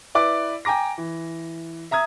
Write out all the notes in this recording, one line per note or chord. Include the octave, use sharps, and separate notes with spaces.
E4 B4 D5 D6
G5 G#5 A#5 D6 A#6
E3
E5 A#5 D#6 G#6